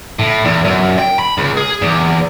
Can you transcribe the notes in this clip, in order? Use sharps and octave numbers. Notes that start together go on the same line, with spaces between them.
A2
E2
F#2
G5
B5
C#2
G#4
E2